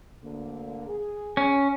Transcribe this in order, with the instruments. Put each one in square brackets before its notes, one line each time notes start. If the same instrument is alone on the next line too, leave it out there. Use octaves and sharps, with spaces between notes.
[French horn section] D2 D3 A#3
G#4
[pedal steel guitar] C#4